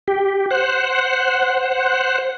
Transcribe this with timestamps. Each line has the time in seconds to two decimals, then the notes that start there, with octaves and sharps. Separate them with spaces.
0.08 G4
0.51 C5 F#5